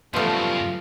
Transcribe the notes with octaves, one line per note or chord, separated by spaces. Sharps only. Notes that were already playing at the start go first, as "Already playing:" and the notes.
F#2 C#3 F3 G3 A3 B3 F4